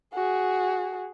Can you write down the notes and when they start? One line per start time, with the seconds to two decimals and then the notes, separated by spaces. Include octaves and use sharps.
0.14 F#4 G#4